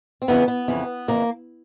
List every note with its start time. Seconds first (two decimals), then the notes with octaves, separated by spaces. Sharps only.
0.22 C4
0.28 F2 C#3 E3 B3
0.48 B3
0.68 F2 C#3 E3
1.08 F2 C#3 E3 A#3